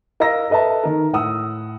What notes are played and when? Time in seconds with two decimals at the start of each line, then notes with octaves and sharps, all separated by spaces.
0.20 A#4 D#5 F5 A#5 E6 A#6
0.50 A4 B4 D#5 E5 A5
0.84 D#3 A#4
1.13 A2 F#5 D#6 E6